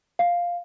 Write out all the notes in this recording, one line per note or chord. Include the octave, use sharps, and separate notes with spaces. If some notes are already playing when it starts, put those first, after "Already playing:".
F5